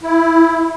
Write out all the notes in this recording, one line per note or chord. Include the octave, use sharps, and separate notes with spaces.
E4